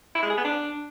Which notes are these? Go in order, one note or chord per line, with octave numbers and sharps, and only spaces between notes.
E4
G#3
G#4
B3
D4